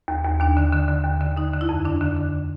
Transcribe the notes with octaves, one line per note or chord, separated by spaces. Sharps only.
D#2
D#2
D#2 D4
D3
D3
D3
D#2
D3
D3 D#4
D3
E4
F2
D3 D4
D3
D3